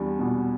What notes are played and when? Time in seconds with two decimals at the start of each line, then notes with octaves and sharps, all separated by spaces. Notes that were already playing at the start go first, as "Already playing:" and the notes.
Already playing: E2 G3 D4
0.19 B2